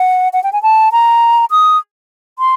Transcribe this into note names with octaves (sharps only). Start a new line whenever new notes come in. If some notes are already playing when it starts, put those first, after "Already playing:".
Already playing: F#5
F#5
G5
G#5
A5
A#5
D#6
C6